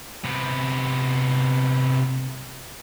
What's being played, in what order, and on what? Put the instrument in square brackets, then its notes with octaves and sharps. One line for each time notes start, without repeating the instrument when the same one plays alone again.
[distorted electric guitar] C3 B3